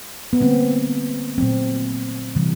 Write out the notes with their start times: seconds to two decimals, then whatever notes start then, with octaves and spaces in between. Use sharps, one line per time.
0.33 B3
0.41 D3 G3 A#3 C4
1.38 A#2 F#3 A3 C4
2.35 C3 E3 G3